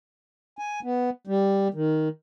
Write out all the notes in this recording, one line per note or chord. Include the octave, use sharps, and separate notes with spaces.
G#5
B3
G3
D#3